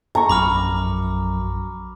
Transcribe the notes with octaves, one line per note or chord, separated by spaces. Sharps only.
G2 A#5 C#6
A#1 F#2 B5 D6 F6